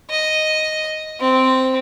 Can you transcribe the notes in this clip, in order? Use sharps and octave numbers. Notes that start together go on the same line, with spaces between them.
D#5
C4